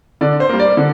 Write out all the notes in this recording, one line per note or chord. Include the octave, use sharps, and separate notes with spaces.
D3 D5
C5
G3 A#3
D5
D3